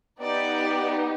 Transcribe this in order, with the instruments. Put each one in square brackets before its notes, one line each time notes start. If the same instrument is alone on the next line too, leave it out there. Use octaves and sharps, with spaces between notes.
[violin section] B3 D#4 G4 D5